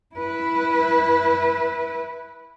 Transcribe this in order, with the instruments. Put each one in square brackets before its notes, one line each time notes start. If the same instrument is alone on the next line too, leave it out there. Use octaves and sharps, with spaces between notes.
[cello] E4 B4